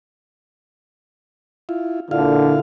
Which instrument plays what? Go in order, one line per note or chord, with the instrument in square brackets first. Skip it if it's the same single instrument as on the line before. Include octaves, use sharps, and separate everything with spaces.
[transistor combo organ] E4 F4
[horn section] A#2 D3 [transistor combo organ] E4 F4 F5